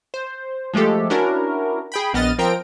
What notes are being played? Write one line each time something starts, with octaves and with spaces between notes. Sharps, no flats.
C5
F3 G#3 A3 G4 A4
C#4 D4 E4 F#4 A#4
G#4 G5 B5
A#1 B3 D#5 F6 A6 D#7
F3 C4 A#4 G5 A#5 D7